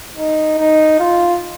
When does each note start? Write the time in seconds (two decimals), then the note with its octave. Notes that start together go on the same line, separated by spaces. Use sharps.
0.17 D#4
0.58 D#4
0.99 F4